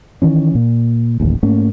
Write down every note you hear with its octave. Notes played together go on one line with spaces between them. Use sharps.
D#3 E3 C#4
A#2
D1 A1 D#2
G#2 A3 A#3 C#4